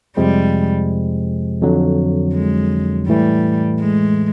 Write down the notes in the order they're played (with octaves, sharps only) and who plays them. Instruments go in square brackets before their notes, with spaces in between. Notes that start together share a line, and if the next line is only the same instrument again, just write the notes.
[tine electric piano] F2 C3 F3 G#3 C4 [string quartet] G3
[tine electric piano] F2 D3 F#3
[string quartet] G#3
[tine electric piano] A2 E3 A3 [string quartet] G3
[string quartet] G#3